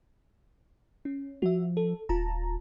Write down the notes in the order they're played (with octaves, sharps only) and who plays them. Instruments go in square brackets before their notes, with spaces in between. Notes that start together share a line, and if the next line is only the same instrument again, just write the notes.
[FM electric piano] C#4
[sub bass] F3 [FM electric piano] F#4 E5
[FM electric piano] A4
[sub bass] D#1 [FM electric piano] F4 A5 A#5